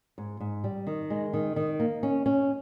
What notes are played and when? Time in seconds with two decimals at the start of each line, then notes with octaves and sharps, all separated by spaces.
0.18 G#2
0.40 G#2
0.64 G3
0.87 D#3
1.10 G#3
1.33 D#3
1.56 D#3
1.80 A#3
2.03 C#4
2.26 C#4